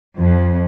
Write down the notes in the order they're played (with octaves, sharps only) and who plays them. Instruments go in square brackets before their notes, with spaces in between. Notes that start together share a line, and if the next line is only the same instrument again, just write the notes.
[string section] F2